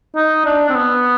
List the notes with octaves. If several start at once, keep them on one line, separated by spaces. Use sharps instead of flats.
D#4
D4
C4
B3